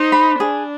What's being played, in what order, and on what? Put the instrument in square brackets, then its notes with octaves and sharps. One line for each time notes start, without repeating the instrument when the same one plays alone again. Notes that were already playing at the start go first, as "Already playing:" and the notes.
Already playing: [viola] D#4 [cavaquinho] C5
[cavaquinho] B5
[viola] D4 [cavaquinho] G#4